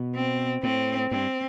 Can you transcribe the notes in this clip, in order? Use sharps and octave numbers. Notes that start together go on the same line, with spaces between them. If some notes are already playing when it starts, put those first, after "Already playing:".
Already playing: B2
C4
A2 C4
G2 C4